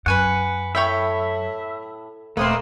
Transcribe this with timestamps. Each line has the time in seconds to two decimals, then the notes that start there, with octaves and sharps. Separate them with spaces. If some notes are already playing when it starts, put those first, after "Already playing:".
0.06 F#2 B4 F#5 G#5 C#6
0.75 A2 C#5 E5 G5 B5
2.37 D#1 A3 A#3 C4 B4 D#5 C6